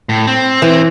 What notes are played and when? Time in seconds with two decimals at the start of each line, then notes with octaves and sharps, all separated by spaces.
0.09 A2
0.27 C4
0.62 E3